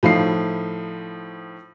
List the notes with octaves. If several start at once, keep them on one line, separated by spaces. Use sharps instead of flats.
A2 F3 D#4 C7